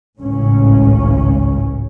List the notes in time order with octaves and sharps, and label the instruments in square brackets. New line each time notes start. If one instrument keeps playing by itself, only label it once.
[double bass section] G#1 C#2 A2 C#4